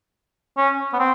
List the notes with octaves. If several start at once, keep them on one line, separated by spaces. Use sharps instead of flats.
C#4
B3
C4